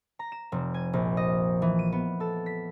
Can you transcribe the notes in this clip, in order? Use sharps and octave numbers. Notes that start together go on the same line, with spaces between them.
A#5
E7
F1
G#5
A#1
D#5
E3
D#7
B3
A4
B6